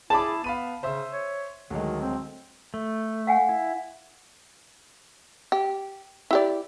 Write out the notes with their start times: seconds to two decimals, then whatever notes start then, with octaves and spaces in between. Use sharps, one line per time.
0.10 E4 G#4 A5 B5 D6
0.44 B3 F5 B5 D#7
0.83 C#3 C5 E5 E6
1.12 C#5
1.71 D2 D#3 F#3 G#3
2.02 C4
2.74 A3
3.27 F5 F#5 G#5
3.49 E4
5.52 G4
6.31 E4 G4 D5